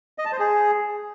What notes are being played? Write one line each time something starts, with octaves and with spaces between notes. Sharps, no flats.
D#5
A5
C5
G#4